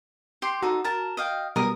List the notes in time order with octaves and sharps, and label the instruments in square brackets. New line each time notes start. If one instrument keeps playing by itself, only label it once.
[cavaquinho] G4 [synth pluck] C6
[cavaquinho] D#4 A4 [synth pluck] F#4
[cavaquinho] A#4 A5
D#5 F5 G5
[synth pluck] B2 G3 [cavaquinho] A#4 D#6